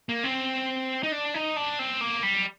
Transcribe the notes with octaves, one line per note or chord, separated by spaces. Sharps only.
A#3
C4
D#4
D4
D#4
D4
C4
A#3
G3